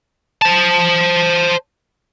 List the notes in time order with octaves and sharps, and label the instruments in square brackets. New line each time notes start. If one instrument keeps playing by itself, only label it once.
[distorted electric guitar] C5 A5